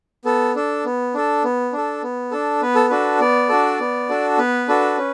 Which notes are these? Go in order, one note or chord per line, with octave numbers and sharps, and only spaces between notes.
B3 A4
D4 A4
B3
D4 A4
B3
D4 A4
B3
D4 A4
B3 B4
A4
D4 F#4 A4 B4
B3 D5
D4 F#4 A4
B3
D4 F#4 A4
B3 B4
D4 F#4 A4
C#4